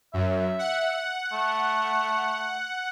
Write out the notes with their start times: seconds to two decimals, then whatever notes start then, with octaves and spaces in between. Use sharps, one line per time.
0.14 F#2 E5
0.59 F#5
1.33 A3